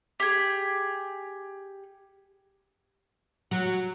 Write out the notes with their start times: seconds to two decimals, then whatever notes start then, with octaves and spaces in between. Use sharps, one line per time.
0.20 G4 G#4
3.51 F#3